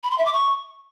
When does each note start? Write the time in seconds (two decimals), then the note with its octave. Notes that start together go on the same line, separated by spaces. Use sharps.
0.03 B5
0.11 C6
0.18 E5
0.26 D6
0.33 C#6